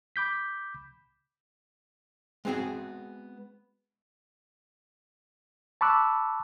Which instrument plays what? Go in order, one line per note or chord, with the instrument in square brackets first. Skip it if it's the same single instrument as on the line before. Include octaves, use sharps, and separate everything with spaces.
[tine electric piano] B5 D6 G6 B6
[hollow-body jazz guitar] G#3 B3 C4 F#4 G#4
[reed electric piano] A5 B5 C#6 D6 E6 F#6